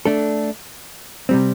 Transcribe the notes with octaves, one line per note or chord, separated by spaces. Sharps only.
A3 D4 A4
C3 G3 C4